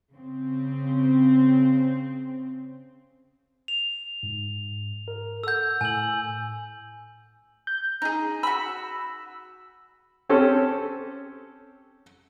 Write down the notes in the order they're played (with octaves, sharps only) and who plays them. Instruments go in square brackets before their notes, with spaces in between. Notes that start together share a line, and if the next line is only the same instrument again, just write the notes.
[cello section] C#3 C4
[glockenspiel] F7
[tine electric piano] G#2
A#4
[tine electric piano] A4 F#5 [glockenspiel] E6 G6
[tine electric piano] A2 E6 [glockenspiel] G#5 F#7
[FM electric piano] G6
[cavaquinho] D#4 G#4
[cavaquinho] F#4 B5 [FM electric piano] E6
[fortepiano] C4 C#4 G4 A4